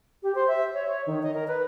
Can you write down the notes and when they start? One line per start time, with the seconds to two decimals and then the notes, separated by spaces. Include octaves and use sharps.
0.23 G4
0.35 C5
0.47 E5
0.73 C#5
0.87 C#5
1.06 D#3
1.23 D#5
1.34 A#4
1.47 B4